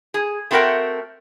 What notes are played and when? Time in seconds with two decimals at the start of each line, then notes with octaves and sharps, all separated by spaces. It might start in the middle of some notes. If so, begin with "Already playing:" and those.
0.14 G#4
0.51 A3 C4 F#4 A#4 F#5 G5